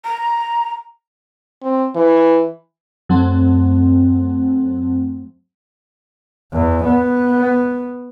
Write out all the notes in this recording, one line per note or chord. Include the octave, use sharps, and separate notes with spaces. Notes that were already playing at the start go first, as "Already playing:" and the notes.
A#5
C4
E3
F#2 F#3 A3 C4
E2
B3